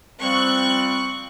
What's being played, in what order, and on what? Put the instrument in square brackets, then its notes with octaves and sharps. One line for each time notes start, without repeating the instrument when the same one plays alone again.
[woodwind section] F3 G3 C4 [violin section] C#6 F#6